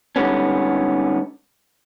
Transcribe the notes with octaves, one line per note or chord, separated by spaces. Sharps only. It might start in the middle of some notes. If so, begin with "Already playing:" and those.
G#2 D3 G3 A#3 B3 C#4